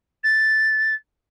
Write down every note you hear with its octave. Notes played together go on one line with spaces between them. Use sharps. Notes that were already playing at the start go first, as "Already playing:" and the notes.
A6